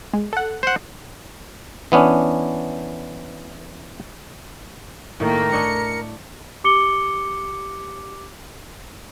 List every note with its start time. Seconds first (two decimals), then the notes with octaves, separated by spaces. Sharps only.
0.13 G#3
0.33 A4 F#5
0.63 C5 F#5
1.92 E3 B3 C#4 D4
5.20 A2 D#3 A3 A#3 A#4
5.53 D4 C#5 D#5 C#7
6.64 G4 D6 C#7 G7